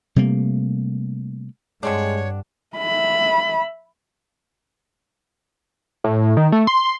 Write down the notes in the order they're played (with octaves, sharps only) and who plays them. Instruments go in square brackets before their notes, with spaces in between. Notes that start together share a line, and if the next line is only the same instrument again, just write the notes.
[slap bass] C3 G3 A3 A#3
[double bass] G2 [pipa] D3 C4 D4 [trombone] G#3 [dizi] C#5
[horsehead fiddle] E5 B5
[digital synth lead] A2
D#3
A3
C6